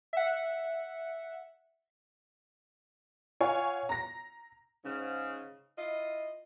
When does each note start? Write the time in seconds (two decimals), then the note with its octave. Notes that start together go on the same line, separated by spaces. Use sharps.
0.13 E5 F#5
3.40 F4 C#5 F5 F#5 G#5
3.89 A#5 A#6
4.85 G#2 C#3
5.78 E4 F4 D#5